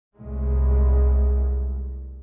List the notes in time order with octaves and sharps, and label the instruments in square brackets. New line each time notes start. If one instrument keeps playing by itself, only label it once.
[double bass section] C2 A2 G#3